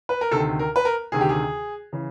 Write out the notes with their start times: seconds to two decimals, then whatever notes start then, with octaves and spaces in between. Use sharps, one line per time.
0.09 B4
0.21 A#4
0.31 D2 C3 D#3 A4
0.59 A#4
0.76 B4
0.85 A#4
1.12 D2 C3 D#3 G#4
1.21 G4
1.29 G#4
1.93 C#3 E3